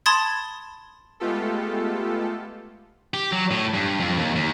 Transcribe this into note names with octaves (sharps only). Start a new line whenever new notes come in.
A5 B5 C6 D#6 G#6 A6
G#3 A3 B3 F4 G4 A4
G4
F#3
A2
G2
F2
D#2
D#2